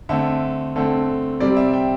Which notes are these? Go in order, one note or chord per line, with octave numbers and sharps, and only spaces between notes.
D3 A3 C4 E5
D3 A3 C4
C3 G3 C4 D5
E5
G5